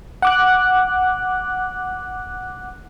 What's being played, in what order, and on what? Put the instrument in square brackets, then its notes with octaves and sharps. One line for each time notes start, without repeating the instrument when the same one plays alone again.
[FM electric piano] F#5 D6 F#6